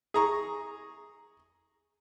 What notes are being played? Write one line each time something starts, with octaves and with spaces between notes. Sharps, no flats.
G#4 A#5 C#6